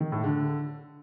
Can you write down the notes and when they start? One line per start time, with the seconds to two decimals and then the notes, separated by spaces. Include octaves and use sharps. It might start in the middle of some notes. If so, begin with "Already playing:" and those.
0.01 D#3
0.12 A2
0.24 D3